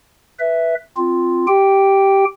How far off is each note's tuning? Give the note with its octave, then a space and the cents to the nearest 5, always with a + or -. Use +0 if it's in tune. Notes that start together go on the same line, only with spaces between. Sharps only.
B4 +0 E5 +0
C4 +0 F4 +0
G4 -10 G5 +0